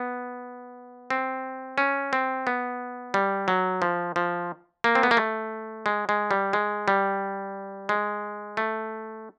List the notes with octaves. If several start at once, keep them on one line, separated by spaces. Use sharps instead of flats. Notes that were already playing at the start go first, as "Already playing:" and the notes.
Already playing: B3
C4
C#4
C4
B3
G3
F#3
F3
F3
A#3
C4
B3
A#3
A3
G#3
G#3
G3
G#3
G3
G#3
A3